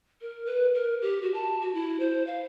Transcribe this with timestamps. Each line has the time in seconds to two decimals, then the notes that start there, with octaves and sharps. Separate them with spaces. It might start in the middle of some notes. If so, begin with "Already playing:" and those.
0.21 A#4
0.46 B4
0.75 A#4
1.02 G4
1.22 F#4
1.34 A5
1.62 F#4
1.74 E4
2.00 C5
2.27 F5